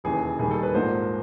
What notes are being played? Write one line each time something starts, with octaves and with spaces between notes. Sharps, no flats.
E1 D#2 C#3 E3 G#4
D#2 D#3 G3 G#4
A4
B4
A#1 G#2 F3 A#3 C5